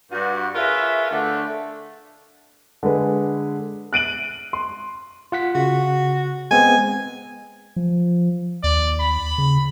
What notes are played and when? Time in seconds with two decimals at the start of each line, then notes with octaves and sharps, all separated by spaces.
0.12 G2 F#4
0.54 F4 G#4 A#4 B4 C#5 E5
1.11 D3 A3
2.83 D3 G#3 B4
3.93 F#6 D7 D#7 F#7
4.53 C6
5.32 F4 F#5 B6
5.55 C#3 F#4
6.51 G#3 B3 C4 G#5
7.76 F3
8.64 D#2 D5
9.00 B5
9.38 C#3